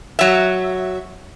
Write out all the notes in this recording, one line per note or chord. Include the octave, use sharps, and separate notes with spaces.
F#3 E5